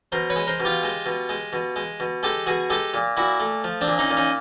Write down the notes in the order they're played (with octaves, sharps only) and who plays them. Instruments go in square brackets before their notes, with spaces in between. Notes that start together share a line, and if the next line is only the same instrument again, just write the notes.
[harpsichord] B2 A#4 C5
B4 C#5
G#3
A#4 C5
B2
F4 G4
G#3
B2
G#3
B2
G#3
B2
G#3 G4 A4
B2 F#4 G#4
G#3 G4 A4
A#2
A#2 E4 F#4
A3
F3
C4 D4
A#2
C#4 D#4
A#2
C#4 D#4